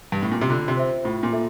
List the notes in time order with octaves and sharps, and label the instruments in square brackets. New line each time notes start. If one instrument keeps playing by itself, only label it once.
[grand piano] G2
A2
A#2
C3
[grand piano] D3 [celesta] F4
[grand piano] C3
[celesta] C5 E5
[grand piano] A2 [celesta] F4
[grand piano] A#2
[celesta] A4 E5